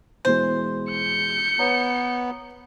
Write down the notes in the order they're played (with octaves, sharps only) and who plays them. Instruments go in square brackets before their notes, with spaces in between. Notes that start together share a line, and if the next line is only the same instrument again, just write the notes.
[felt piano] B2 E3 G#3 [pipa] C5
[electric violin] G6 C#7
[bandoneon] B3 [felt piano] B4 C#5 A#5